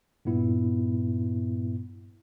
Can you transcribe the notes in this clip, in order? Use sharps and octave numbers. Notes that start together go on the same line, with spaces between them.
G2 A#2 B3 E4